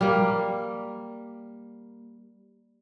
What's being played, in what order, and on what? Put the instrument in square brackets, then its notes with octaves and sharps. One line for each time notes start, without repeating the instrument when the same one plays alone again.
[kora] G3 A#3